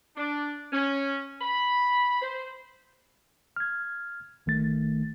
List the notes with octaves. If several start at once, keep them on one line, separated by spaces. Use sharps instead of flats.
D4
C#4
B5
C5
F6 G#6
A#1 D#3 A3 A6